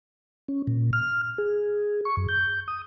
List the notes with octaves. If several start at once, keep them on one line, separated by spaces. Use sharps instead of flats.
C#4
A#2
F6
G#4
C#6
F#2
G6
D#6